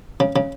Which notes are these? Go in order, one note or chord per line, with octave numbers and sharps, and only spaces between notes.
C#3
C#3